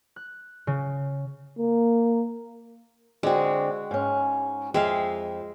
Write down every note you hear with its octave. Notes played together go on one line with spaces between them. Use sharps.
F#6
C#3
A#3
D3 G#3 C4 F#4
G#2 C#4
F2 G#3 E5 F5 G5